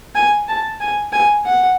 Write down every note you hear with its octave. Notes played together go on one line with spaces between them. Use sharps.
G#5
A5
G#5
G#5
F#5